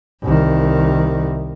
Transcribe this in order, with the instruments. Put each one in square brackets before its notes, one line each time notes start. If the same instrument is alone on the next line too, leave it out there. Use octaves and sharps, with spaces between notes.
[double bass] C2 D#3